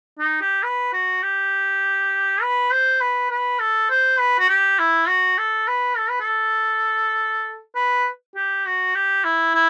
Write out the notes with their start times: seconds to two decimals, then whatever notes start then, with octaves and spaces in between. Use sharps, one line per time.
0.19 D#4
0.41 G4
0.63 B4
0.93 F#4
1.23 G4
2.42 B4
2.72 C5
3.01 B4
3.30 B4
3.60 A4
3.90 C5
4.20 B4
4.39 F#4
4.49 G4
4.79 E4
5.08 F#4
5.38 A4
5.68 B4
5.98 A4
6.10 B4
6.20 A4
7.76 B4
8.35 G4
8.66 F#4
8.95 G4
9.25 E4
9.54 E4